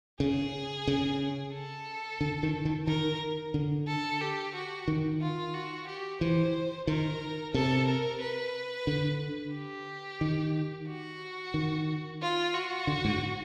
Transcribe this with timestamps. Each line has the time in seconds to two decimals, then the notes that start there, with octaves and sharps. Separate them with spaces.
0.20 C#3 G#4
0.88 C#3
1.54 A4
2.21 D3
2.43 D#3
2.65 D#3
2.87 D#3 A#4
3.54 D3
3.88 A4
4.21 G4
4.54 F#4
4.88 D#3
5.21 F4
5.54 F#4
5.87 G4
6.21 E3 C5
6.87 D#3 A#4
7.54 C3 A4
7.87 A#4
8.21 B4
8.87 D3
9.54 G4
10.21 D#3
10.88 F#4
11.54 D#3
12.21 F4
12.54 F#4
12.87 D3
13.05 G#2